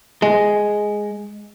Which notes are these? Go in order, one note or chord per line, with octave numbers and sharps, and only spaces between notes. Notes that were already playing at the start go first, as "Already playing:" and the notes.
G#3